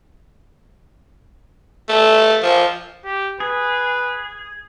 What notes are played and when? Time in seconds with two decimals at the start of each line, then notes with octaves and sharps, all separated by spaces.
1.89 A3
2.42 F3
3.04 G4
3.40 G#4 B4